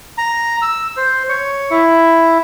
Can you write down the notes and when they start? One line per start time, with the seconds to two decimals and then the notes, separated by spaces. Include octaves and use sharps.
0.18 A#5
0.62 E6
0.97 C5
1.29 C#5
1.71 E4